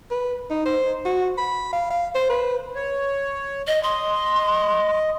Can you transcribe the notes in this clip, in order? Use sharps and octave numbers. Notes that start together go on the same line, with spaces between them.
B4
D#4
C5
F#4
B5
F5
F5
C5
B4
C#5
D#5
D#5 C6